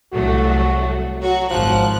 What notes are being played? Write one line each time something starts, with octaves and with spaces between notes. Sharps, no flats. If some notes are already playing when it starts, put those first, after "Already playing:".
C2 F#3 A3 F#4
F#3 F#4
G#1 F3 F#6